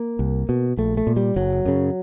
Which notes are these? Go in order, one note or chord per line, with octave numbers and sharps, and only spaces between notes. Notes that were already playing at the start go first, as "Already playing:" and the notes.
Already playing: A#3
C2
B2
A#1 A3
A3
A#2
G3
F#1 F#3
F#2 C#3